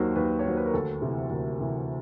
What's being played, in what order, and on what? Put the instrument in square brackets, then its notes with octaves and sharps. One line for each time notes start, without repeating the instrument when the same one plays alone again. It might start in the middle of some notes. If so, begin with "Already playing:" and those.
Already playing: [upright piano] D#2 D#3 F#3 C5
D#2 B4
C#5
D#3 F#3 C5
B4
A#4
D2 A4
C3 E3
D2 A#4
C3 E3